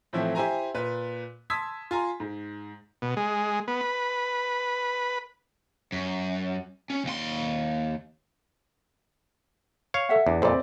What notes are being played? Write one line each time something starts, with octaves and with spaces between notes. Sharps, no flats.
A2 E3 F3 A3 C4 E4
E4 G4 C5 G#5 A#5
A#2 B4
A5 C6 D#6 E6 G#6 B6
F4 G#5 A#5 C6
G#2
B2
G#3
B3
B4
F#2
C#4
D#2 C6
C#5 F5
A4 E5 F#5
E2 D4
F2 A#2 C4 G#4 D5 B5